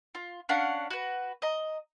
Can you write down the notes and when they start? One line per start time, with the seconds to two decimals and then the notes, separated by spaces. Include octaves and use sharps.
0.15 F4
0.49 C#4 D4 F5 F#5
0.90 F#4 B4
1.42 D#5 A#5